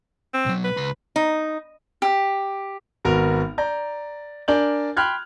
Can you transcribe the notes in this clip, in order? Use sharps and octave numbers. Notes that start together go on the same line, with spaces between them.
C4
B1 F#3
B4
C#2 B5
D#4
G4
G#1 B3 F#4 A#4 F7
D5 A#5 G6
D4 A#4 D5 G#5 G6 F#7
G5 B5 C6 F6 F#6 G#6